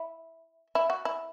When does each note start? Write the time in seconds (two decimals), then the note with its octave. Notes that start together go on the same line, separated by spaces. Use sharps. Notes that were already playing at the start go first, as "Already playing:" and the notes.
Already playing: E4
0.75 E4
0.90 F#4
1.05 E4